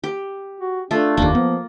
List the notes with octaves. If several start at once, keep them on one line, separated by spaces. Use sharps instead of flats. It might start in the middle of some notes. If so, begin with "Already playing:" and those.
G4
F#4
A3 D4 F4
F1 D#2 A#3 D4
F3 B3